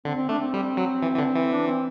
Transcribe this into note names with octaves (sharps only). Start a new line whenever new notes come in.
D3 C4
C4
A3 D4
C4
G3
F#3
E3
E3
D3
E3
D4
C4